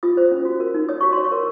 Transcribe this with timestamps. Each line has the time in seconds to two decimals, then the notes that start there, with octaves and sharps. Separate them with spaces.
0.03 F4 D#6
0.17 C5
0.31 C#4
0.45 F#4
0.60 A#4
0.74 D#4
0.89 C#5 D#6
1.01 F#4 C#6
1.13 C#5 C6
1.24 C#6
1.32 A#4